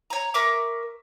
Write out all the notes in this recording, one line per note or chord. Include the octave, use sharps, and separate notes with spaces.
C#5 A#5
A#4 E5 C#6 D6